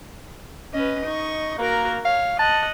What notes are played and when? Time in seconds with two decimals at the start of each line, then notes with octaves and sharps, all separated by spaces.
0.74 C#4 B4 D#5
1.06 D#4 C#6
1.58 A#3 F#4 A#4
2.05 C#5 F5
2.39 D#5 F#5 A5